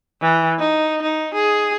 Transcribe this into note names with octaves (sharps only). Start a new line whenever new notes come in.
E3
D#4
D#4
G#4